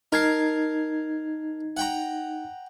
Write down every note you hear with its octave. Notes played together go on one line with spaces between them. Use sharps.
D#4 A#4 A5 G#6 C7
F#5 G5 A#5